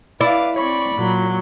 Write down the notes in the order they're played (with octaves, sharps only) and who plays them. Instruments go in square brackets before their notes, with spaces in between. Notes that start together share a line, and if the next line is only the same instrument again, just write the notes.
[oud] E4 [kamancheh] B4 F5 [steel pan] D5 [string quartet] D6
[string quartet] C4 C#6 [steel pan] C#5 [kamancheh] D5 B5
[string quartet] A#2 F#3